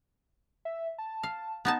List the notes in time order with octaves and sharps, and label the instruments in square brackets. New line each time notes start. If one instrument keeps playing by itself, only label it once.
[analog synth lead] E5
A5
[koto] F5
B3 D#4 A5